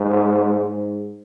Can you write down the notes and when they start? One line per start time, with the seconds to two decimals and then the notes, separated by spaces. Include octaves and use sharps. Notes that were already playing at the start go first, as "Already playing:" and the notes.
Already playing: G#2
0.60 G#2